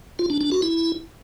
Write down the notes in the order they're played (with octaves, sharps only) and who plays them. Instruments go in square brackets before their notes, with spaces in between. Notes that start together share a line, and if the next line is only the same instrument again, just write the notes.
[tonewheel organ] F4
D4
D4
F#4
E4